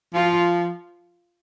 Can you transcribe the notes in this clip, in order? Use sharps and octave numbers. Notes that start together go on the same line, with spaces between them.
F3 F4